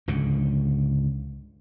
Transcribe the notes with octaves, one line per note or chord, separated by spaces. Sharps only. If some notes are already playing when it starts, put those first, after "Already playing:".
C#2 G#2 D3